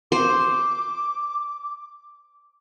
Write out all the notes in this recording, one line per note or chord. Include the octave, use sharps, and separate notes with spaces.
C5 D6